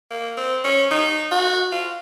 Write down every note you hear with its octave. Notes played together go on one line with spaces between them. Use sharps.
A#3
C4
C#4
D#4
F#4
F4